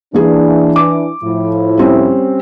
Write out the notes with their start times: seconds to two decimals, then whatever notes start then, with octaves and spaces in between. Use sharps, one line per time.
0.14 E3 A#3 D4 G#4
0.76 D6
1.24 A2 F3 E4
1.77 G3 C4 C#4